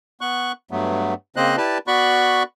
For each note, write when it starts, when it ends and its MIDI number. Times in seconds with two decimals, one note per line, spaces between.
0.21 0.52 59
0.21 0.52 85
0.21 0.52 90
0.71 1.14 43
0.71 1.14 54
0.71 1.14 57
0.71 1.14 59
1.36 1.56 49
1.36 1.56 58
1.36 1.56 60
1.36 1.56 72
1.36 1.56 75
1.36 1.56 90
1.57 1.78 64
1.57 1.78 67
1.57 1.78 71
1.57 1.78 74
1.57 1.78 81
1.87 2.43 59
1.87 2.43 66
1.87 2.43 74
1.87 2.43 83
1.87 2.43 85
1.87 2.43 90